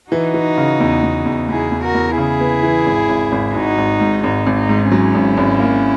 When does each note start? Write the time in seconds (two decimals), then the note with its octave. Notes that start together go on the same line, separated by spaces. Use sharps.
0.11 E3 D#4 F#4
0.34 E3
0.57 C#3
0.80 E2
1.03 E2
1.25 E2
1.49 E2 E4 G#4
1.72 E2
1.83 F#4 A#4
1.94 E2
2.17 C#3 E4 G#4
2.41 B3
2.63 E3
2.86 G#1
3.09 G#1
3.32 G#1
3.54 G#1 D#4 F#4
3.78 G#1
4.00 G#2
4.23 G#1 D#4
4.46 G#1
4.58 D#4
4.69 G#2
4.92 F#3 C#4 E4
5.14 G#1
5.37 G#1
5.60 A#3